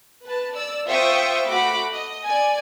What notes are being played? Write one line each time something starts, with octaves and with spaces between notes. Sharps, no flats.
B4 A5
D5 E6
F4 C5 E5 G5 C#6 D#6
A3 F#4 B5 D6
D#5
D5 G#5